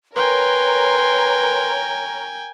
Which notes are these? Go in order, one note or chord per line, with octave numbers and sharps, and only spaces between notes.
A#4 B4 C#5 G5 G#5 C6